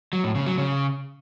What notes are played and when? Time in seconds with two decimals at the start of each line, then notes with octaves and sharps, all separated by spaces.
0.13 F#3
0.24 A2
0.35 C#3
0.47 F#3
0.58 C#3